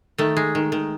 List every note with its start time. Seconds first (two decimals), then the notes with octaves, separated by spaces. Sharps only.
0.18 D#3 A3
0.37 G#3
0.55 D#3
0.72 D#3